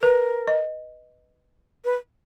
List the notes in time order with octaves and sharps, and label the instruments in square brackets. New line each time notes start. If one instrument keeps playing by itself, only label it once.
[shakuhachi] A#4 [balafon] B4
[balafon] D#5
[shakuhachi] B4